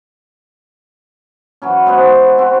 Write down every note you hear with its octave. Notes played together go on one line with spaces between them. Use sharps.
E3 F#3 C#4
G#3 B3 F#4 C5
C4 F#4